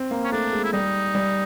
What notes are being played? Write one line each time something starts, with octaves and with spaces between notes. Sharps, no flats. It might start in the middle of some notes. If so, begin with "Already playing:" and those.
Already playing: C4
A#3
C#4
A3 D4
G#3
E4
G3 D#4
G3